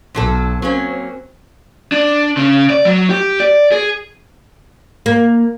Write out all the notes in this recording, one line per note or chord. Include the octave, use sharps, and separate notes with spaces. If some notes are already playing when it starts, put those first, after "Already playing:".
B1 G#2 F#3 A4
F#3 A#3 C4 C#4
D4
C#3
D5
F#3
G4
D5
G#4
A#3